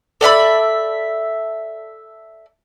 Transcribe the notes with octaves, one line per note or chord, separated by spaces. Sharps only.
A4 D5 E5 B5